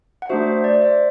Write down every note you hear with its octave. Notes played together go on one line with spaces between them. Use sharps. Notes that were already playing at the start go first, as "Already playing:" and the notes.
F#5
A3 D4 F#4 C5 E5
C5
D5
D5
C5 E5